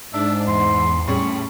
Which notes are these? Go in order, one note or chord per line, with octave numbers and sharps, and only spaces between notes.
G#2 D4 E5
E2 C6
A2 G3 C#4 G#4 C#6